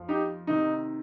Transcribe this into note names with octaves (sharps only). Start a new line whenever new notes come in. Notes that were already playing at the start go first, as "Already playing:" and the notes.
Already playing: F2 F3
D#4 G4
C3 D#3 D#4